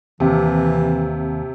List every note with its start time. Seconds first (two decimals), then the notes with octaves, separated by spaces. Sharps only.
0.20 D#2 C3 E3